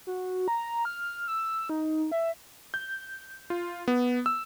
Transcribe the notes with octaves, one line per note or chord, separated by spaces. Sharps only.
F#4
A#5
F6
E6
D#4
E5
G6
F4
B3
E6